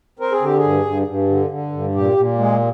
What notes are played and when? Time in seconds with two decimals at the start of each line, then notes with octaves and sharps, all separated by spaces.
0.19 C4 A#4
0.32 G#4
0.41 D3 G4
0.57 G#4
0.64 G2
0.86 G2
1.07 G2
1.29 D3
1.50 D3
1.72 G2
1.95 A#2 G4
2.17 A#2
2.38 G#3